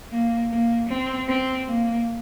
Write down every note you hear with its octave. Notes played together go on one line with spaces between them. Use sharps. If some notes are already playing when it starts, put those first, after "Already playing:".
A#3
A#3
C4
C4
A#3